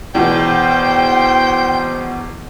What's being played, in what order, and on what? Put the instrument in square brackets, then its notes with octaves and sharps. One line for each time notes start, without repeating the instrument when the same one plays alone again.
[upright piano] E2 B2 [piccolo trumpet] C5 [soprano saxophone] G5